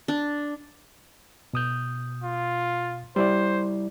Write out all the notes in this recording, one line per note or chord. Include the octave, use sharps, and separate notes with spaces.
D4
B2 D#6 G6
F4
G3 E4 C5 D5